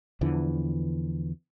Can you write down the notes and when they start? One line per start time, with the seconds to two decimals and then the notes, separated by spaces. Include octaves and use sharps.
0.21 E2 D3 E3 F3